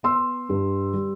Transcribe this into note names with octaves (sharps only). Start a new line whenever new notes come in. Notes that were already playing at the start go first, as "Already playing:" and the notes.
B3 C6 E6
G2
G3